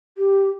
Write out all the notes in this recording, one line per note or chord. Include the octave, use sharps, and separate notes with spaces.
G4